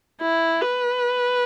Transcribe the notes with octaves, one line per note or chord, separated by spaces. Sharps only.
E4
B4